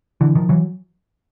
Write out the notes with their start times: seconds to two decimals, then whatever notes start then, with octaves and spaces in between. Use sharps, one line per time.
0.21 D3 E3
0.35 D#3 F3
0.49 E3 F#3